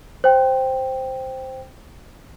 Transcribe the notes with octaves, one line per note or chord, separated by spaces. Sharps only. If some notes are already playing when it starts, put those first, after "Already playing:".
C5 G5